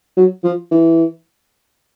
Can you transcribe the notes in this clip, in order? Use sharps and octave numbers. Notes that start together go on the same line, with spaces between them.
F#3
F3
E3